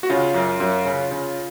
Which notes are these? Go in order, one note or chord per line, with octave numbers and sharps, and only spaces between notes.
F#4
C#3 F4
F#2
F#2
C#3
C#3